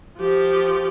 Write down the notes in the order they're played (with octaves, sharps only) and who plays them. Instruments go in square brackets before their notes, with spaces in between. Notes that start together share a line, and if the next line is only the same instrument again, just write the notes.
[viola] F3 G4